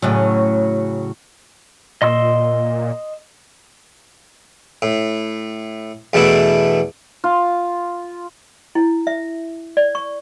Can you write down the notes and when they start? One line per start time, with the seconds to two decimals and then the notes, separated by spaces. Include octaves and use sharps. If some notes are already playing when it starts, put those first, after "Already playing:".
0.02 A2 C#3 F#3
2.02 A#2 D#5 C6 E6
4.82 A2
6.13 E2 B2 A3 D4 E4
7.24 F4
8.75 E4
9.07 E5
9.77 D5
9.95 C#6